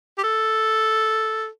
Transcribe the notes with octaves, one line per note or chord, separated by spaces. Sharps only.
G4
A4